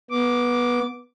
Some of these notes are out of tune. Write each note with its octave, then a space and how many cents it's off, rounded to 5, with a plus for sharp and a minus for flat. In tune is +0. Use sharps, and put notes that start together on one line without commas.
B3 -15 D6 -5